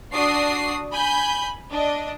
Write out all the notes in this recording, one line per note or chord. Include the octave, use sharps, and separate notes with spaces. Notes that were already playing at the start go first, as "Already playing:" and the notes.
D4 F#4 D#6 C7
G#5 B5 G6
D4 D#5